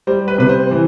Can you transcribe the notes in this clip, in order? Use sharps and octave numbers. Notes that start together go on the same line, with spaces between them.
G3 C5
B4
C3 B4
C5
E3